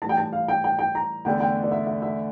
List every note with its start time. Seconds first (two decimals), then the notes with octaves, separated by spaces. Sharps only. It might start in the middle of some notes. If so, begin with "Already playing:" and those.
0.02 A2 E3 G3 A5
0.09 G5
0.17 A5
0.33 F5
0.48 G5
0.64 G5
0.79 G5
0.95 A#5
1.25 E2 D3 A3 D4 G5
1.40 G5
1.63 D5
1.71 E5
1.87 E5
2.02 E5